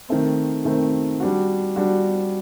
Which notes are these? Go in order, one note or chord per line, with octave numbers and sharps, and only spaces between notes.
D#3 A3 C4
D#3 A3 C4
G3 D4 F#4
G3 D4 F#4